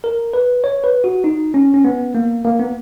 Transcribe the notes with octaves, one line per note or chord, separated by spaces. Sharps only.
A#4
B4
C#5
B4
F#4
D#4
C#4
C#4
B3
A#3
A#3
B3